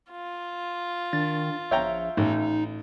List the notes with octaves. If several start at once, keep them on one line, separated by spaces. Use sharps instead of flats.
F4
D#3 D4 A6
A#1 C#5 E5 G5 A#5
A1 D#4